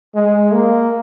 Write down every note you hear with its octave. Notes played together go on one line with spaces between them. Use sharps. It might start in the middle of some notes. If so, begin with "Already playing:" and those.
G#3
A#3